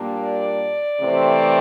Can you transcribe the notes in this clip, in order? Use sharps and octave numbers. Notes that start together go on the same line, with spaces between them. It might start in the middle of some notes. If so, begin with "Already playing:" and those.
Already playing: A#2 G3 A#3 D4
D5
C3 E3 A3 C4